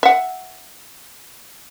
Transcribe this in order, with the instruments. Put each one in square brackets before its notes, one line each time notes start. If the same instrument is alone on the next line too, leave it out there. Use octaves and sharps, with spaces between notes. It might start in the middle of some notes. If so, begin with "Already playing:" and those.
[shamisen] E5 F#5